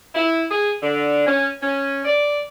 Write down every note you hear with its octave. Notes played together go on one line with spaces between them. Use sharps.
E4
G#4
D3
C#4
C#4
D5